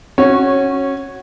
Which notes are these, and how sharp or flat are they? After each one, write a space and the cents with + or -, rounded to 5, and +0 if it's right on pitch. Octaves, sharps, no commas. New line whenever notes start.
C#4 -20 F#4 +0 C#5 -10